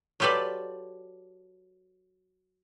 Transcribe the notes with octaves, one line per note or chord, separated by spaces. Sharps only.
F#3 F4 G4 A4 B4 D5